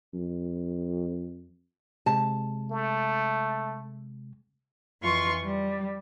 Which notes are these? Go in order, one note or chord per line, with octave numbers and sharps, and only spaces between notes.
F2
C3 G#3 A5
A3
F2 E3 F4 C6 C#6
G3